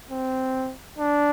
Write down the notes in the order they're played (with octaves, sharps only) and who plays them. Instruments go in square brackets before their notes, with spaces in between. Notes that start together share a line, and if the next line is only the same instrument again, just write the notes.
[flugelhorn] C4
D4